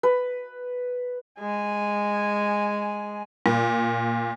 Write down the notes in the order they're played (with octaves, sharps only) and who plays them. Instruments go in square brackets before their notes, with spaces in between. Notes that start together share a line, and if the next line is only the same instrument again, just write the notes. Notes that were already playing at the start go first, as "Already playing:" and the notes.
[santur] B4
[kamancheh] G#3 G#5
[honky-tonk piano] A#2